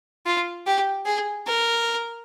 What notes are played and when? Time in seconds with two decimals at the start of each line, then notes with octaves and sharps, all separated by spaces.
0.26 F4
0.67 G4
1.06 G#4
1.47 A#4